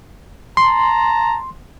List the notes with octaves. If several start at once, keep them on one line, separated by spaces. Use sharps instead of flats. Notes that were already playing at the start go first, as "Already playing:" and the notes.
A5 A#5 C6